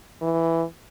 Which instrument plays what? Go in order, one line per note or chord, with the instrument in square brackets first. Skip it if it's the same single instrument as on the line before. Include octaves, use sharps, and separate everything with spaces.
[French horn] E3